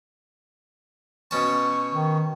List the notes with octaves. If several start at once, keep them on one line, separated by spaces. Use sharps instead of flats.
B2 C#4 A5 C#6
D#3